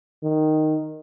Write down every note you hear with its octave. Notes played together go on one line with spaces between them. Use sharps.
D#3